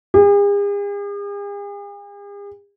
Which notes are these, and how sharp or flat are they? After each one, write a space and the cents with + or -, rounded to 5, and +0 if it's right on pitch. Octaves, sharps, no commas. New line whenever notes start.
G#4 -45